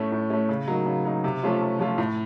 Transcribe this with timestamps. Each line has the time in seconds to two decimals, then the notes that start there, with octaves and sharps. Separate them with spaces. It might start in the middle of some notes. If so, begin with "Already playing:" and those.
Already playing: A2 A3 C#4
0.12 A2
0.30 A3 C#4
0.49 C#3
0.68 F#3 A#3 D#4
0.86 C#3
1.05 F#3 A#3 D#4
1.24 C3
1.43 F3 A3 C#4 F4
1.62 C3
1.79 F3 A3 C#4 F4
1.98 A2